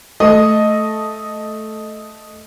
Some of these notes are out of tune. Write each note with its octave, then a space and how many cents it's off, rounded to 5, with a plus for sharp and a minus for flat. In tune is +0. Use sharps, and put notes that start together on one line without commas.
A3 -10 D#5 +0